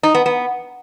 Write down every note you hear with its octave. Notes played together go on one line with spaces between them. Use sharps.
D#4
B3
B3